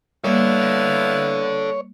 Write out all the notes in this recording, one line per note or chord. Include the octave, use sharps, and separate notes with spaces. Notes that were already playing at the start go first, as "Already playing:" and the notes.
G3 A#3 B3 E4 A4 C#5 D5 F5